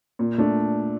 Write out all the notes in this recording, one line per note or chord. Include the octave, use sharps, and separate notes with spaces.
A#2
A3 D4